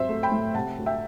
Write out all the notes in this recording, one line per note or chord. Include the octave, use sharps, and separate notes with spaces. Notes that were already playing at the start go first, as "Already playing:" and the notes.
Already playing: F#3 C4 C5 E5
A3
G5 B5
A2
C3 F#5 A5
D2
E5 G5